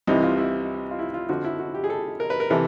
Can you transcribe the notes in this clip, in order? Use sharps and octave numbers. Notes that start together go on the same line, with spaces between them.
C2 C3 E3 D#4
F4
E4
F4
E4
F4
F2 D3 F3 F#4
E4
F#4
G4
G#4
A4
A#4
B4
A#4
C3 E3 A4